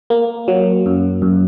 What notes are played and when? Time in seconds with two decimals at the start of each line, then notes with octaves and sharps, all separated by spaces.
0.10 A#3
0.48 F#3
0.86 F#2
1.22 F#2